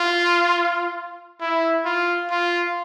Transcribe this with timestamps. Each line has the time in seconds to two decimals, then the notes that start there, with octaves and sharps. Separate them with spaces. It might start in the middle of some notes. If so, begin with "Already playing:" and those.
Already playing: F4
1.41 E4
1.85 F4
2.31 F4